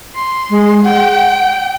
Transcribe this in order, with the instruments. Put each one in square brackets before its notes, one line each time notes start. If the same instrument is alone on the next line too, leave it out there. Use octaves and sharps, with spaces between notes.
[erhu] C6
[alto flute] G#3
[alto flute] F#5 [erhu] G5